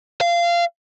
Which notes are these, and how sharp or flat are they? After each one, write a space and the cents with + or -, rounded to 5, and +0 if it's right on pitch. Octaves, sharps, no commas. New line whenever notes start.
F5 -20